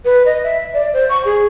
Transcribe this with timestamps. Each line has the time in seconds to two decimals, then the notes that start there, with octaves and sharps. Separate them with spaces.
0.05 B4
0.26 D#5
0.44 E5
0.74 D5
0.94 C5
1.09 C#6
1.25 G#4